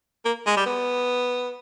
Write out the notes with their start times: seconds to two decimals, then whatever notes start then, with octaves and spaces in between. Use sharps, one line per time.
0.25 A#3
0.46 G#3
0.57 G3
0.66 B3